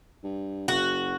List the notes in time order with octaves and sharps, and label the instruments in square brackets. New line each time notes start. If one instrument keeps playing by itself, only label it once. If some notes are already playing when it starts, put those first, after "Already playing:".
[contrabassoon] G2
[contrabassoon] F#1 [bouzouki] F#4